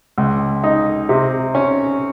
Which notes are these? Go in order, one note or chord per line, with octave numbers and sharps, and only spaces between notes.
C#2
D#4
C3
C#4